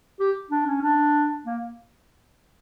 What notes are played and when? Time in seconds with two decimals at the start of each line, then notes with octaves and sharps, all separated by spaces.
0.20 G4
0.51 D4
0.66 C#4
0.82 D4
1.46 A#3